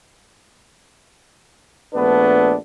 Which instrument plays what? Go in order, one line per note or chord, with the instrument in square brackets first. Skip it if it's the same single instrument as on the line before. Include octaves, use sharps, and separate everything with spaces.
[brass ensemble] A#1 A3 B3 D4 B4